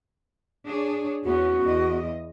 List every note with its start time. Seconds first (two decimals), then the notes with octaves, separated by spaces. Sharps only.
0.67 D4 G#4 C#5
1.25 E2 B3 C#4 F#4
1.63 E2 D#5